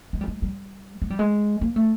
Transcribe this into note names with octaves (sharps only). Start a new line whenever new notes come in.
G#3
G3
G#3
G3
G#3
G3
G#3
A#3
A3